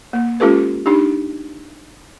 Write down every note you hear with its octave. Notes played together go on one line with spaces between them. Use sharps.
A#3
G#3 C#4 F4 G4 A4 B4
D4 D#4 G4